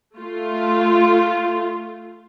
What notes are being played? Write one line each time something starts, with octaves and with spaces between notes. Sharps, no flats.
A3 F4